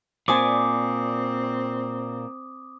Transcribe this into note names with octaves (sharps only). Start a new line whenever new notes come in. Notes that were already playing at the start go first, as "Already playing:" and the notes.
A#2 C4 C5 D5 G#5 D6 D#6